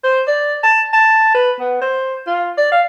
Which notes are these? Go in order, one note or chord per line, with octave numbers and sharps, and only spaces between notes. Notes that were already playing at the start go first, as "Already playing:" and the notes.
C5
D5
A5
A5
B4
B3
C5
F4
D5
F5